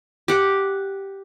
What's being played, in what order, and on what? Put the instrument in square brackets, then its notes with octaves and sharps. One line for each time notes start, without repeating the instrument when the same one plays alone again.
[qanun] G4 F#5